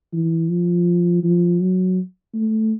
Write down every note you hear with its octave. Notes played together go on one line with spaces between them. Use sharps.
E3
F3
F3
F#3
A3